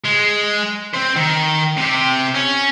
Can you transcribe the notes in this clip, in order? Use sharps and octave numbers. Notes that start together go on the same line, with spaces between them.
G#3
C4 C5
D#3
C3 G4
C#4